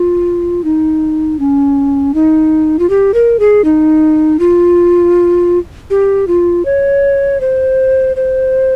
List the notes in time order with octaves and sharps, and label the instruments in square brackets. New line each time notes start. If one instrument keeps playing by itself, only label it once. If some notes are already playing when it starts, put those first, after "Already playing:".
Already playing: [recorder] F4
D#4
C#4
D#4
F4
G4
A#4
G#4
D#4
F4
G4
F4
C#5
C5
C5